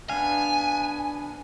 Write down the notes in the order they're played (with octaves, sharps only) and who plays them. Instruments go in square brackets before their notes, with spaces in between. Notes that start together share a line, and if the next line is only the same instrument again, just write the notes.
[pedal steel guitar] B3 D4 F5 [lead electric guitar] G#5